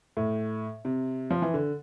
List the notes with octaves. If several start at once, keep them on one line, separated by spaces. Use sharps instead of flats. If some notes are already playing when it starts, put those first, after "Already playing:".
A2
C3
F3
E3
D3